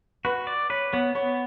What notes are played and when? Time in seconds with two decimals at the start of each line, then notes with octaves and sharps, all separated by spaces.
0.25 F#4 B4
0.47 D5
0.70 B4 C#5
0.93 B3 C#5
1.15 B3 C#5